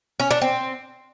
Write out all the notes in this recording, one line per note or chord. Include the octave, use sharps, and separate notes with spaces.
C#4
D4
C4